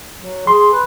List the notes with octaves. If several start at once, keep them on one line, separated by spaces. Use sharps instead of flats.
F#3
G#4 C6
B4